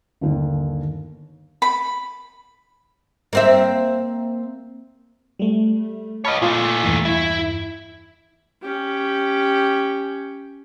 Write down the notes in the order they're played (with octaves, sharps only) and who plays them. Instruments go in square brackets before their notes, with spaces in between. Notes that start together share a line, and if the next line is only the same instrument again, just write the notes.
[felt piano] G1 D#2
[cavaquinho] B5
[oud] A#3 C4 E5
[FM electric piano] G3 A3
[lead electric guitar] C#5 D#5 [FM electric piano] A5 B5 F6
[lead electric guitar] A#2 A3 [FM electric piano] F4
[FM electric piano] E2 G2 E3
[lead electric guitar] E4
[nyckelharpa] C#4 G4